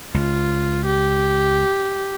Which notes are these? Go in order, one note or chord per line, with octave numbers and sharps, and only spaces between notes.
C#2 F4
G4